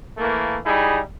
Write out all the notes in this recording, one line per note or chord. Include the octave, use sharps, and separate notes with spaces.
E3 A3 A#3
G3 D#4 E4 G#4